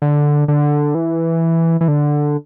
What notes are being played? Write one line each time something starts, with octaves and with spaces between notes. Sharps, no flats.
D3
D3
E3
E3
D3